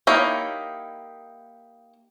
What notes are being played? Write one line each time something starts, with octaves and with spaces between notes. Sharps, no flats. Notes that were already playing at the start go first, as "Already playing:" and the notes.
A#3 D#4 E4 G4 C#5